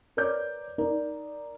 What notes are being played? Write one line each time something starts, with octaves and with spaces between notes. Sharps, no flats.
A#4 B4 C#5 D5 D6 G6
D#4 A#4 D5